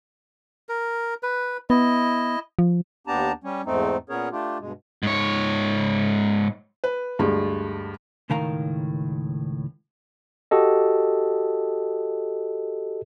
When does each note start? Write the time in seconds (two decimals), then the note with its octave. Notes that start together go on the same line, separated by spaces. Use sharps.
0.69 A#4
1.23 B4
1.70 B3 E4 D#5
2.59 F3
3.07 D#2 B3 D4 G4 A5 A#5
3.44 G3 C#4
3.66 E2 G#2 A3 C4 D#4
4.10 A#2 B3 C#4 G#4 A#4 C#5
4.32 A3 D4 F4 G4
4.60 G2 B2 G#3
5.03 G#2 C#5
6.84 B4
7.19 D2 G2 G#3
8.30 C#2 A2 D#3 A#4 F5 A#5
10.51 F#4 G4 A4 D#5